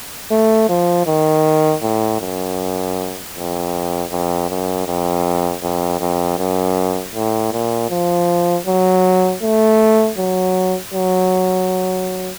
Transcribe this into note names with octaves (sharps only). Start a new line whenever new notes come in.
A3
F3
D#3
A2
F#2
F2
F2
F#2
F2
F2
F2
F#2
A2
A#2
F3
F#3
A3
F#3
F#3